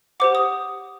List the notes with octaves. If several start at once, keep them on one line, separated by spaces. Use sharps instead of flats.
G4 C5 F#5 D6
D#6